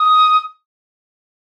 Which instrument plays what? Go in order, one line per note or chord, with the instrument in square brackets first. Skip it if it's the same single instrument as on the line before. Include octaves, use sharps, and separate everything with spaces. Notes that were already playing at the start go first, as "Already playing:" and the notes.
Already playing: [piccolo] D#6